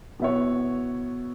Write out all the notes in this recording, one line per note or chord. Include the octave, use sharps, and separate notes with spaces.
B2 B3 E4 C#5